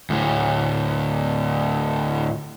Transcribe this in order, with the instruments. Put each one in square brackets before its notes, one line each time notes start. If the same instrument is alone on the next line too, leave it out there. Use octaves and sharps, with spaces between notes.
[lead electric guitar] D2 A2